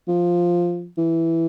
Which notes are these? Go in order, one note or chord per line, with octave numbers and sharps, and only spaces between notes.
F3
E3